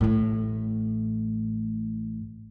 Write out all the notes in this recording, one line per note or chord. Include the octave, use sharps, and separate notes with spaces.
A1 A2